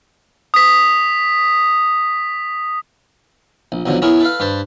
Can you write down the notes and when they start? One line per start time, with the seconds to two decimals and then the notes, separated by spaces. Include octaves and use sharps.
0.54 D#6 B6
3.72 A#1
3.86 B1 B2 D3 F3 F#3
4.02 B3 E4 G#4 A#4 C#5
4.20 A4 B4 F5
4.40 G2 B4 C5 A5